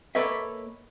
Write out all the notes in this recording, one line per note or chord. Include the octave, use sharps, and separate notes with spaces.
A#3 A4 B4 C#5 D#5 E5